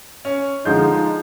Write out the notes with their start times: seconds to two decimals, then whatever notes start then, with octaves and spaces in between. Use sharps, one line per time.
0.25 C#4
0.65 D3 F3 G#3 D#4 G6